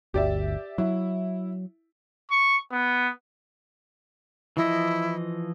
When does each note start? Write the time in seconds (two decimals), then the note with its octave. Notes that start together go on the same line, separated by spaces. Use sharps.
0.14 G1 D2 G4 D5 E5
0.78 F#3 E4
2.31 C#6
2.72 B3
4.57 E3 F3 E4 D#5